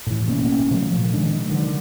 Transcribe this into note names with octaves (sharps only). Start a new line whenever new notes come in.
A2 E3
A1 B2 A#3 C#4
C3 F3 F#3 A3
A#2 F3
C3 D#3 G#3 D4
D3 D#3 F#3